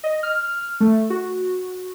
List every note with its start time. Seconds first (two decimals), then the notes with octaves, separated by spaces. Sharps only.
0.04 D#5
0.23 F6
0.80 A3
1.10 F#4